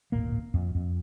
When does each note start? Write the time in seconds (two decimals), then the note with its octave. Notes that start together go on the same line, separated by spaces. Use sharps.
0.12 D1 G#1 A#2 A#3
0.54 F2
0.75 F2